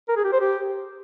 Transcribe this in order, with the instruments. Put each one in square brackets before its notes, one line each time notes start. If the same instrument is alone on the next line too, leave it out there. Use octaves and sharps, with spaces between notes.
[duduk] A#4
G#4
G4
C5
G4